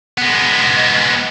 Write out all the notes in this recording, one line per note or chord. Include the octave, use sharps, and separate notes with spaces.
G#3 B3